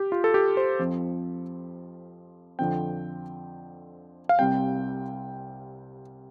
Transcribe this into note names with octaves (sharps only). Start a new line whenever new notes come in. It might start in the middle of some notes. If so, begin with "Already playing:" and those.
Already playing: G4
F4
A4
G4
C5
F2 F3 C4
F2 D3 F3 C4 G5
F5
C2 C3 G3 C4 G5